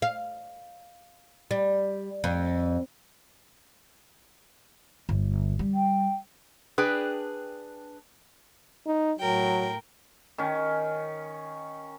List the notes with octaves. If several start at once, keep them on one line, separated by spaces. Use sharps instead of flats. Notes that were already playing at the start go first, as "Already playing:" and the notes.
F5
G3
F2
G1
G3
G5
D4 G#4 B4 G5
D#4
A2 F#3 A#4 G5
D#3 C#4